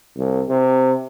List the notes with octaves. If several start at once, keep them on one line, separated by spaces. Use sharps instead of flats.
C2
C3